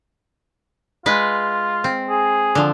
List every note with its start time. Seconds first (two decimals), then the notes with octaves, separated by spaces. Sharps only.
1.06 G#3 F4 B4
1.84 C4
2.09 G#4
2.55 D3 F3